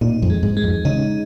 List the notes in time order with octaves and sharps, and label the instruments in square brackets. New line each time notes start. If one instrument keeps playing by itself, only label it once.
[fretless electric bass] A#2 [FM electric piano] D#4
[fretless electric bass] F2
[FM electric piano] G#3
[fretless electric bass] G#2
[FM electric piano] G#3
[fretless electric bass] F2
[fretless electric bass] C#3 [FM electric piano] D#4